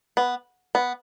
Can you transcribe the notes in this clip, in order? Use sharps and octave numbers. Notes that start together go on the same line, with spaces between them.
B3
B3